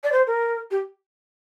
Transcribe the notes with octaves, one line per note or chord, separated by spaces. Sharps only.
D5
C5
A#4
G4